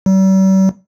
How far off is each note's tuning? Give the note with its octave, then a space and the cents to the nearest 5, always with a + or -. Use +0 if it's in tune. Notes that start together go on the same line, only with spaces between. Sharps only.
G3 -45